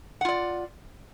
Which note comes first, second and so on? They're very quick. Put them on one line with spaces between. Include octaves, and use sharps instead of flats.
F#5 F4 D5